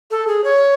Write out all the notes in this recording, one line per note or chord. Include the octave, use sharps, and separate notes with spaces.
A4
G#4
C#5